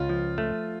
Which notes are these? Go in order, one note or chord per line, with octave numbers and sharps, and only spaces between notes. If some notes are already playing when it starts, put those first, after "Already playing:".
Already playing: C#2 F4
F3
A3